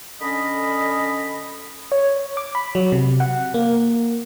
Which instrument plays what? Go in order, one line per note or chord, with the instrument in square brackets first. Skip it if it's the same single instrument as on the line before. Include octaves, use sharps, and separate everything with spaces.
[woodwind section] D3 C#4 D#5 B5
[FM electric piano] C#5
D6
B5
F#3
C3
F#5
A#3